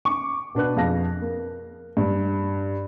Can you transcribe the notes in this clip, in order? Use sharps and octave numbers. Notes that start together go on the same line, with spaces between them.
C#6 D6
B2 D4 B4 F#6
F2 G#4 F5 A5 A#6
A#3
G2